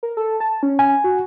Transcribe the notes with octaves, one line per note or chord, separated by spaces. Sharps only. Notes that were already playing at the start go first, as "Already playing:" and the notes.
A#4
A4
A5
C#4
G#5
F#4